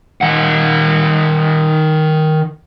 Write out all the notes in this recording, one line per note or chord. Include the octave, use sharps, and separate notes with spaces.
D#3 F#5